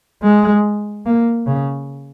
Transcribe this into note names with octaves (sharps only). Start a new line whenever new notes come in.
G#3
A#3
C#3